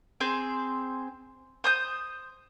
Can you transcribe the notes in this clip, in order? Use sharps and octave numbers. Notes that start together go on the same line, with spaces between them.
C4 G#4 C5
C5 D#6 G6